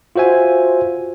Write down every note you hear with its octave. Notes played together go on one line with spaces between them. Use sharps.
F4 F#4 C5 E5 G#5